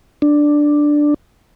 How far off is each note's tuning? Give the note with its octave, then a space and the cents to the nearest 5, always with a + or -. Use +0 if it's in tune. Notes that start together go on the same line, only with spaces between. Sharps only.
D4 +5